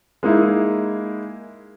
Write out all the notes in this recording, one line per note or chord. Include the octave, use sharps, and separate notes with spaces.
G#3 A#3 D#4 E4